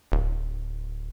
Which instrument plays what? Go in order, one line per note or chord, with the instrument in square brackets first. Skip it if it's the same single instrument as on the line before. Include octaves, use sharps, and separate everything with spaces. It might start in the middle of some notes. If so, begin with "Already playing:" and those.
[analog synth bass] D1